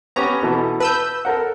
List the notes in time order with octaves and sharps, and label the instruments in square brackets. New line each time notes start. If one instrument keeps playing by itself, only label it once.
[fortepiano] B3 C#4 G4 [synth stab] A#5
[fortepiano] B2 E3 A4
[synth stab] B4 E6 G6 [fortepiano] A5
[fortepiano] A4 A#4 F#5